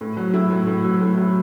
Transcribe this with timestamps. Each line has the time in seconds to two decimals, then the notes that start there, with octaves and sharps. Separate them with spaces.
0.01 A2
0.17 F#3
0.34 A2 E4
0.50 A2
0.67 A2
0.84 F#3
1.01 A2
1.18 F#3